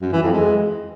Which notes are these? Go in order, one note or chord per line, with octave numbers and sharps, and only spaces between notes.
F#2
E3
F2
G#3